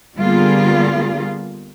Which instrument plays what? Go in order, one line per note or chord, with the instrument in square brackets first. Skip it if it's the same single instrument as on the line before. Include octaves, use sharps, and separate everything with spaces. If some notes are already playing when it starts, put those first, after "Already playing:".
[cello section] D3 G3 A#3 B3 F4 G#4